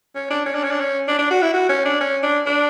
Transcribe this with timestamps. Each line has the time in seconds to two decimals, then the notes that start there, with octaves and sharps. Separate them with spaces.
0.15 C#4
0.30 D4
0.46 C#4
0.55 D4
0.64 C#4
0.71 D4
0.80 C#4
1.08 D4
1.19 D4
1.31 F#4
1.42 E4
1.54 F#4
1.69 C#4
1.85 D4
2.01 C#4
2.23 D4
2.46 D4